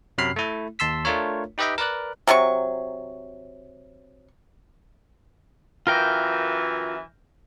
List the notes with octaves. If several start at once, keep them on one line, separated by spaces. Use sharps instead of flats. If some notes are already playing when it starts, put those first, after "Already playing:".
F#2 C3 F#3 B5 F6 C7
A3 E4
D#2 A5 C6 E6 B6
A3 D4 F4 A#4 C#5
D#4 G4 B4 D#5 E5 G5
A#4 B4 D5 F#6
C3 F#3 E4 C#6
F#2 E3 F4 A#4 G5 F6 G6 A#6